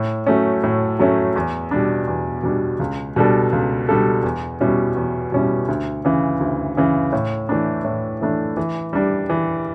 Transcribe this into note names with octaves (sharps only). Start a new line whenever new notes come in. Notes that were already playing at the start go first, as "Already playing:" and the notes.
Already playing: A2
F#3 A3 C#4
A2
F#3 A3 C#4
E2
B2 G3 D4
E2
B2 G3 D4
C#2
B2 G3 D4 A4
C#2
B2 G3 D4 A4
E2
B2 G3 C#4 E4
E2
B2 G3 C#4 E4
D2
C#3 E3
D2
C#3 E3
A2
E3 A3 D4
A2
E3 A3 D4
E3
G3 D4
E3